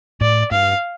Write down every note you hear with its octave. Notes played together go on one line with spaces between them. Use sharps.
A2 D5
G2 F5